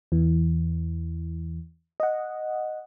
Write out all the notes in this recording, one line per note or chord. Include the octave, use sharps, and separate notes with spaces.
E2 E3
D#5 F#5